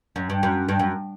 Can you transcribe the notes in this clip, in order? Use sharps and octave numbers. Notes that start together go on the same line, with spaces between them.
F#2
G2
F#2
G2
F#2